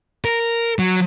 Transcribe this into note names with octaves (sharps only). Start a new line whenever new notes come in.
A#4
F#3